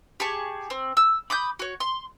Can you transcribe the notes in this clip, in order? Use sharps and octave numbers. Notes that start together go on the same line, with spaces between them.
G4 G#4 A5 C#6
C4
E6
B5 D6 D#6 G6
F#4 C#5
C6